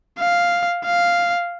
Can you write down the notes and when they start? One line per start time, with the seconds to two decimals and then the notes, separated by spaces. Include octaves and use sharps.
0.19 F5
0.86 F5